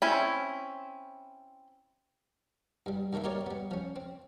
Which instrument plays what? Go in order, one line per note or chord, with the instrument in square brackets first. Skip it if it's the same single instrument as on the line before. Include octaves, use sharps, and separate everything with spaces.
[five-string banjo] C4 C#4 E4
[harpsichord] G2 G3
G2 D#3 A3 A#3 E5
A#3 D#4 G4 A#4 C#5 D5
G3 B3
F3 C#4
C4